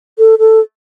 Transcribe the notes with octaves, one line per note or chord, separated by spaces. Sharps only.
A4
A4